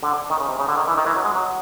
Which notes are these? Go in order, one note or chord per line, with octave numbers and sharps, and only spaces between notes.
D3
D#3
C#3
C3
C#3
D3
D#3
E3
D#3
E3
F#3
G#3
F#3